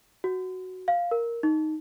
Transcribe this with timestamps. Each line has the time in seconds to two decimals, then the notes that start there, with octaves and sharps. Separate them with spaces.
0.24 F#4
0.88 F5
1.11 A#4
1.43 D#4